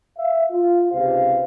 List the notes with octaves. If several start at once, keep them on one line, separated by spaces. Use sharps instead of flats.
E5 F5
F4
C#2 G#2 C3 G4 C5 F5